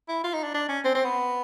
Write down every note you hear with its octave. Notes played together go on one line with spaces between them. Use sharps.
E4
F4
D#4
D4
D4
C#4
C4
C4
B3